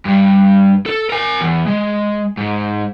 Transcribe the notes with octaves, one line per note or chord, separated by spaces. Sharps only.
G2
A4
A#4 G#5
E2
G#3
G#2